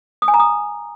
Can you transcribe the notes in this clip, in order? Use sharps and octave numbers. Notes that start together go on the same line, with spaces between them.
D#6
G#5
A#5
D#6